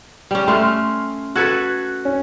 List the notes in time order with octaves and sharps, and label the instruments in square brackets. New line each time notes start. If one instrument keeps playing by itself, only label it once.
[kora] G3 C#4
[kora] A3 [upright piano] C6 F6
[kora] F#4 A4 B4 [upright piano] F#6 G#6 C#7
[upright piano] C#4